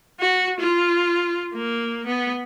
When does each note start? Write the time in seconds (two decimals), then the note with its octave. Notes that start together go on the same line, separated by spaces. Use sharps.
0.20 F#4
0.60 F4
1.54 A#3
2.07 B3